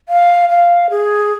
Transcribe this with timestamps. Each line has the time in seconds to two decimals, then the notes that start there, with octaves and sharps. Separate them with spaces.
0.09 F5
0.49 F5
0.90 G#4